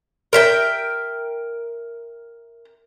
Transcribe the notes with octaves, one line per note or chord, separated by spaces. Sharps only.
A#4 E5 G5